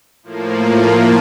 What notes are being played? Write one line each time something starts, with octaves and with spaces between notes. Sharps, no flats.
A2 F3 A#3